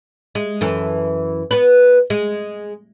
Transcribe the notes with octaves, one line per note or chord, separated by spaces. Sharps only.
G#3
F#2 E3 A4
B3 B4
G#3